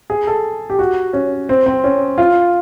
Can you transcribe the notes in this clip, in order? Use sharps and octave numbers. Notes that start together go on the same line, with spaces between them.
G#4
A4
G4
F#4
C#4
C4
C4
C#4
F4